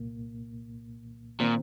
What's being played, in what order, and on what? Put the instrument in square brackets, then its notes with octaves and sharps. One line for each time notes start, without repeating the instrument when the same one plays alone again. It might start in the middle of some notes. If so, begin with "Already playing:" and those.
Already playing: [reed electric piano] C2 A#2 A#3
[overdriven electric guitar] A#2 [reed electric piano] D#3 C4